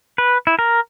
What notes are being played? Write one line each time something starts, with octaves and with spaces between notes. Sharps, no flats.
B4
E4
A#4